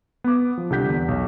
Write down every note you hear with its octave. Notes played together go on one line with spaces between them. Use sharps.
B3 D6
F3
C2 D3 G4 F#5 G6 B6
E2
B1